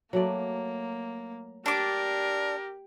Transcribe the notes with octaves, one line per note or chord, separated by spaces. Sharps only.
F#3 A3 A#3 D5
D4 G4 A#4 D6